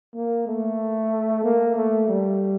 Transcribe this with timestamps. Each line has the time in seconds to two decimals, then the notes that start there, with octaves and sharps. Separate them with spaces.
0.15 A#3
0.47 A3
1.44 A#3
1.76 A3
2.08 G3